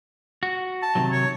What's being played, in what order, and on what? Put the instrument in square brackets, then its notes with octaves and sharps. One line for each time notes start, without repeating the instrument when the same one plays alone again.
[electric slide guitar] F#4
[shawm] A5
[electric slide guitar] C3 D#3 F#3
[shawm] C#5